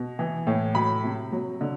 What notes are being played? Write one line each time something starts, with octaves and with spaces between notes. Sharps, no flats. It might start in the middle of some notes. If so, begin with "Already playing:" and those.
Already playing: B2
E3
A2
F#3 B5
C3
F#3
D3